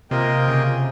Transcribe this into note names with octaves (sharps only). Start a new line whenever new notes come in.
C3 A#3 F4 A#4 D#5 G5
C#3